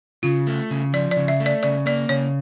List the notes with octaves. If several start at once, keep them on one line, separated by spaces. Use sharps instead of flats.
C#3 F4
A3
C#3
F3 D5
D5
C#3
E5
A3
D5
C#3 D5
A#3 D5
C#3 C#5